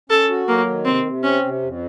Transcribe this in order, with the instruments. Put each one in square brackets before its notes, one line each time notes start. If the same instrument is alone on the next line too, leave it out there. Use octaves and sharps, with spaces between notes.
[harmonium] C#4 [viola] A4
[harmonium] F#4
[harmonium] F#3 [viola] A#3
[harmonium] D#3
[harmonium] C3 [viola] C4
[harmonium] C3
[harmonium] C4 [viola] C#4
[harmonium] C3
F2